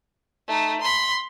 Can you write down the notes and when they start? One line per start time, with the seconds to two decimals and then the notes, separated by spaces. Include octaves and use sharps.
0.48 A3 D#4
0.81 B5 C6